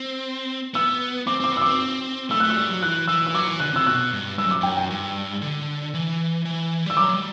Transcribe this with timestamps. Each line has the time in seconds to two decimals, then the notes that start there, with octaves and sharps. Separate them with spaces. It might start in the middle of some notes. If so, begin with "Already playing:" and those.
Already playing: C4
0.74 B3 E6
1.27 C4 D6
1.40 C4 D6
1.52 B3 E6
1.61 C4 D6
2.30 A3 E6
2.40 A3 F#6
2.50 E6
2.56 G3
2.70 F#3
2.82 E3 F#6
3.08 E3 E6
3.27 E6
3.34 F#3 D6
3.47 E3
3.60 D3 F#6
3.72 C3 E6
3.87 B2 F#6
4.12 G2
4.38 G2 E6
4.45 F#2
4.51 D6
4.61 F#2 G5
4.77 G5
4.90 G2
5.42 D3
5.94 E3
6.45 E3
6.86 G3 E6
6.97 F#3 D6
7.09 F#3
7.14 G3